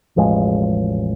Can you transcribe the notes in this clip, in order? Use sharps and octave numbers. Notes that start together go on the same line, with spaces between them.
E1 A1 F3 G#3